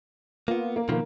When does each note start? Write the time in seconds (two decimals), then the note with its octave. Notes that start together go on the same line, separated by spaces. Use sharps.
0.48 A#3 B3 F4
0.76 A#3
0.89 B2 D#3 F3 A#3